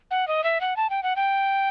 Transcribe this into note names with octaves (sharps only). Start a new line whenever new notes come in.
F#5
D#5
E5
F#5
A5
G5
F#5
G5